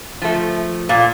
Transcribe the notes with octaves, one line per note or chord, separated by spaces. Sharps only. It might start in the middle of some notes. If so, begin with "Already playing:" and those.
F3 A3
A#2